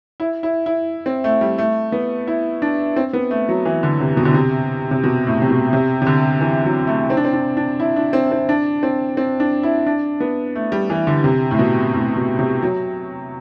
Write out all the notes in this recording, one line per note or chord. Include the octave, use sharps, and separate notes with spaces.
E4
E4
E4
C4
A3
G3
A3
B3
E4
D4
C4
B3
A3
F#3
E3
D3
C3
B2
D3
C3
C3
B2
A2
C3
B2
C3
C3
D3
E3
F#3
A3
C4
D4
C4
D4
D4
E4
D4
C4
C4
D4
C4
C4
D4
E4
D4
B3
A3
G3
E3
D3
C3
A2
B2
A2
B2
C3
F#3